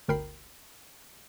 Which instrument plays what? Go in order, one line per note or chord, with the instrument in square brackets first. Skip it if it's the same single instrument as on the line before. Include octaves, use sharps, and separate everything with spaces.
[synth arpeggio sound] G1 D2 A#4 G5 B5 C7